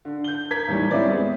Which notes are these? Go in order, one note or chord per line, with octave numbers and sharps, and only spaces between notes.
D3
G6 G7
A#4 G#6 B6
D#2 A2 E3 G3
G3 C4 C#4 E4 B4 D5
G#3 B3 C#4